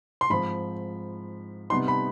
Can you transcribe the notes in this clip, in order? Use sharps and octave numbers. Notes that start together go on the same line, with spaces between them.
C6
G#2 F3 C4 B5
C3 G3 B3 D#4 C6
B5